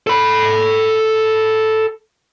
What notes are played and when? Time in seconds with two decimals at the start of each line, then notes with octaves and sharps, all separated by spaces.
0.07 A4 B5